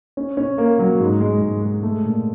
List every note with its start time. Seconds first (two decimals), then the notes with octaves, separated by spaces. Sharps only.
0.17 C#4
0.37 C#4
0.58 A#3
0.79 F#3
1.00 G#2
1.20 G#3
1.41 G#2
1.62 G#3
1.83 A3
2.05 A#2